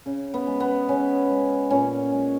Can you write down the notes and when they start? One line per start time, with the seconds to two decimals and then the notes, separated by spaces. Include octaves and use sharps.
0.06 C#3
0.34 B3
0.47 G#3
0.60 B3
0.89 C#3 C#4
1.30 G#3
1.70 A#2 C#4
2.12 G#3